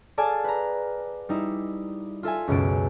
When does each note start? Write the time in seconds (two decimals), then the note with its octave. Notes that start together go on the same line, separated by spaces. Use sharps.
0.18 G#4 A4 D5 F5 G#5 A5
0.44 B4 A#5
1.29 G3 D#4 E4
2.23 F4 A4 E5 G#5
2.48 C#2 F#2 B2 D7